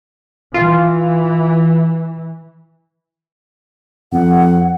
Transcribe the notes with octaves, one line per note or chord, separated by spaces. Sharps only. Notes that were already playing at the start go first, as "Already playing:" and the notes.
E3 F4
F2 F#5